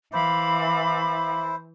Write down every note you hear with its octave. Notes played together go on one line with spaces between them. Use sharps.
E3 E4 C5 F5 B5 D6